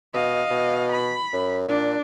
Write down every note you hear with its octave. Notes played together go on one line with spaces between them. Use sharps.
B2 D#5 F5
B2
B5
F#2
A#2 D4